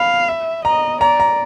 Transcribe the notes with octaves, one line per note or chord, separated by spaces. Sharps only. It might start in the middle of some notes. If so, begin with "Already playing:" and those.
Already playing: F5 B5
E5
D#5 A#5
D5 A#5
A#5